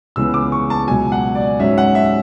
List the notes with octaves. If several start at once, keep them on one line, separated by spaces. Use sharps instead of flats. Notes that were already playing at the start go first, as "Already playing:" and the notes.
C#2 C#3 E3 B3 E6
D6
C#6
A5
C#2 B2 F#3 G#5
F#5
D5
G#2 F#3 C#4 E5
F#5
E5